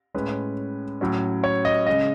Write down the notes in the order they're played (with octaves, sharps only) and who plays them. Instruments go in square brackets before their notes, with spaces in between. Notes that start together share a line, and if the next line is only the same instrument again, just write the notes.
[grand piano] A2 G#3 C#4 B4
A2 F#3 C#4
C#5
D#5
C#3 G#3 C#4 D#5